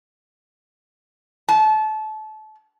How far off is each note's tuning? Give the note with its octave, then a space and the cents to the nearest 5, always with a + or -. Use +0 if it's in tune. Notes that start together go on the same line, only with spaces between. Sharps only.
A5 -30